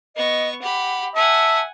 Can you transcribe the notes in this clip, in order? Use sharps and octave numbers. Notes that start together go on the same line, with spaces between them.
B3 D#5 C#6
G4 F#5 B5
E5 F#5 G#5 A5